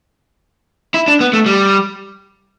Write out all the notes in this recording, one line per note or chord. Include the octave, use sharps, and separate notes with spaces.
E4
D4
B3
A3
G3